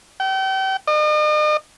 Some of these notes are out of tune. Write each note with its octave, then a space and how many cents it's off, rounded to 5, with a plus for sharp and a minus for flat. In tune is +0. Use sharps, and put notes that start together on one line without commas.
G5 -35
D#5 -45